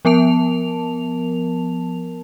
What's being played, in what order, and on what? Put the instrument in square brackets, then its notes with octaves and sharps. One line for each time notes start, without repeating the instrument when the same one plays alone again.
[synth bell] F3 B3 A#4 A5 F7